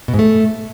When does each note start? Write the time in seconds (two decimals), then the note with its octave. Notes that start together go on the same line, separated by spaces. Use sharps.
0.08 B2
0.14 G#2
0.19 A3